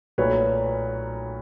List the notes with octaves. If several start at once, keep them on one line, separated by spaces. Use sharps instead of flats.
B1 A#2 F#3 A3 B4 C#5